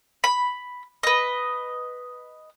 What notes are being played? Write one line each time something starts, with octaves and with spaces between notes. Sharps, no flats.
B5
B4 D#5